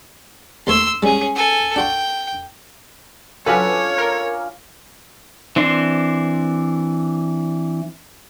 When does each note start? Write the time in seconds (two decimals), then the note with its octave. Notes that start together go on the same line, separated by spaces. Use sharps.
0.67 D#2 A3 C#5 C6 E6
1.03 G3 G#3 C#4 G#4
1.35 A4 G#5
1.76 D4 F#4 G5 C6
3.46 F#3 C#4 D4 F4 A4 B4 C#5 G#5
3.98 A#4
5.56 E3 C4 D4 C6